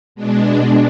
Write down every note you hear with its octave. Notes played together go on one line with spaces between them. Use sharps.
B2 G#3 D4